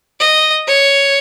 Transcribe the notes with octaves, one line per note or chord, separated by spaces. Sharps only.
D#5
C#5